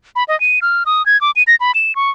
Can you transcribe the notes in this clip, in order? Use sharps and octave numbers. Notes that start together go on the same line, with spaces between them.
B5
D#5
D#7
F6
D#6
G#6
D6
D#7
A#6
B5
E7
C#6